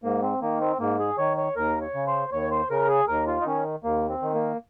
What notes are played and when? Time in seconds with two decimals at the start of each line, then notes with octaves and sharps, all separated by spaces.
0.03 G#2 A#3
0.23 C4
0.42 D#3 A#3
0.61 C4
0.80 G#2 A#3
0.99 G#4
1.18 D#3 C#5
1.37 C#5
1.56 D#2 A#4
1.81 C#5
1.94 C#3
2.07 C5
2.32 D#2 C#5
2.51 C5
2.70 C#3 A#4
2.88 G#4
3.08 D#2 A#4
3.27 F4
3.41 D#4
3.45 D#3 C#4
3.84 D#2 A#3
4.09 C4
4.22 D#3
4.34 A#3